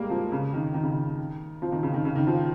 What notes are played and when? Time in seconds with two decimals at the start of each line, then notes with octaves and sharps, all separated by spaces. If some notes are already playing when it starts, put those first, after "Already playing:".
Already playing: G3 G#3 A#3
0.10 F3
0.32 C#3
0.54 D#3
0.74 D#3
0.83 C#3
0.93 D#3
1.62 F3
1.72 D#3
1.83 C#3
1.94 D#3
2.05 C#3
2.15 D#3
2.27 F3